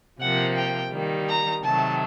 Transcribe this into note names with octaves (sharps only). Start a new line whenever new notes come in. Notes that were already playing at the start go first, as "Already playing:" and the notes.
C3 F3 A#3 F#5
G5
D#3 G3 A#3
A#5
C3 D#3 F#3 A3 A5